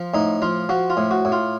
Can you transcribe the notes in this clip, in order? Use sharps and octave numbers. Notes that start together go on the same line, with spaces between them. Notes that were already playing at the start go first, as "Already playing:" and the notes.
Already playing: F3
A2 D#4
F3 F4
F3 F#4
F4
A2
F#4
A2
F4